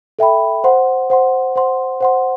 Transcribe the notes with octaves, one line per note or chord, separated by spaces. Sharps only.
A4 E5 G5 B5
C5 F#5 C6
C5 F#5 C6
C5 F#5 C6
C5 F#5 C6